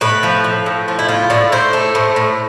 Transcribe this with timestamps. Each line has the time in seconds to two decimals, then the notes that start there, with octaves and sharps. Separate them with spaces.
0.01 A2 B4
0.23 F3
0.44 F3
0.66 A2
0.88 F3 F4
0.99 E4
1.08 A2 F4
1.30 A2 D5
1.52 A2 C5
1.73 A3
1.95 A2
2.16 A2